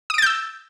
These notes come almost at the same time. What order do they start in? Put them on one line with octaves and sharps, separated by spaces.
D#6 D7 A6 G6 E6